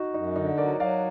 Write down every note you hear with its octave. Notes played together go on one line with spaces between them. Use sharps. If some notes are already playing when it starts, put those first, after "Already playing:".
Already playing: D#4 F#4
F#2 D#4
D3 D#4
F#3 A#4 D5
F#3 D5 F5